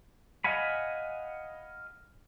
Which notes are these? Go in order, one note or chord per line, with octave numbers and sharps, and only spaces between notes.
D#5 F5 F#5 G#5 B5